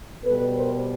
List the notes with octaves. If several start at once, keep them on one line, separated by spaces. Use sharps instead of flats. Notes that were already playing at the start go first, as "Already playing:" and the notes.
B2 G3 A4 B4
A#4 C5